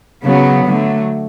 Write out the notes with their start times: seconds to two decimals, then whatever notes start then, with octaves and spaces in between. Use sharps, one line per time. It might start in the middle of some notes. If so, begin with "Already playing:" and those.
0.24 C#3 F#3 B3
0.66 D3 F#3 A3